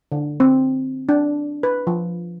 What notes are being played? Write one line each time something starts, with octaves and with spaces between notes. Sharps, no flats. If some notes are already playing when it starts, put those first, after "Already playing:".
D3
C4
D4
B4
F3